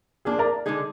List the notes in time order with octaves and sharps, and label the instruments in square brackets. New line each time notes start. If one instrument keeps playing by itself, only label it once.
[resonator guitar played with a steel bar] F3 A#3 D4 [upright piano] G#4
[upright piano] A#4 D5
[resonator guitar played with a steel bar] D3 G#3 D#4 G#4